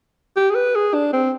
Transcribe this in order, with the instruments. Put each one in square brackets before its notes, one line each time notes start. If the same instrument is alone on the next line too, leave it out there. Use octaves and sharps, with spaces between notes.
[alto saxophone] G4
G#4
B4
G#4
D4
C4